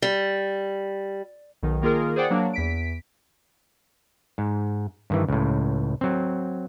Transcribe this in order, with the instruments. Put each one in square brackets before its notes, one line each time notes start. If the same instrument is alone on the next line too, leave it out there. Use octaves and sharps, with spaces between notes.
[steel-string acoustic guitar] G3
[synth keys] B1 D#3
D#3 A#3 F4 G#4 A#4
G#4 C5 D5 F#5 G5
F#3 A#3 D4
E2 B6 D7
[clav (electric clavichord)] G#2
G2 D#3 E3
C#2 A2
F#3 C4